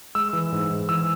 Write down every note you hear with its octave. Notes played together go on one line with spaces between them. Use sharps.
G#3 E6
E3
G#2
G#2
E3 E6